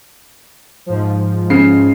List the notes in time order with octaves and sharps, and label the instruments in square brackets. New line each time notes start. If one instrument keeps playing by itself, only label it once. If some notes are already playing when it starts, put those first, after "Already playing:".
[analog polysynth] G#2 F3
[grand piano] C#3 C7